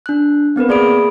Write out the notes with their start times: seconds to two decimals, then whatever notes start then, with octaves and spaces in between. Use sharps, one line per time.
0.06 D4 F#6
0.56 B3 C4 A#4 B4
0.68 A#3 G#4 D5 B5 D#6 D7